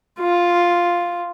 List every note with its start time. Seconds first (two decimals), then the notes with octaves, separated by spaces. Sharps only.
0.20 F4